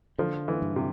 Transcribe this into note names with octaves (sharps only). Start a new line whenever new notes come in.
D3 F3
E3
G2
C3